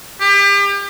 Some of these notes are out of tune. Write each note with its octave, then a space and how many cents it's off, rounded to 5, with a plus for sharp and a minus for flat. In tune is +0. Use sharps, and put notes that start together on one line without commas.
G4 +35